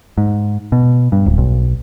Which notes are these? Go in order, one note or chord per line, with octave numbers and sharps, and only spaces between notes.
G#2
B2
G2
D1
B1